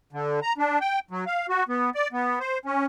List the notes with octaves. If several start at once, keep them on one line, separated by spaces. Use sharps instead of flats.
D3
A#5
D4
G5
F#3
F5
F#4
B3
D5
B3
C5
C#4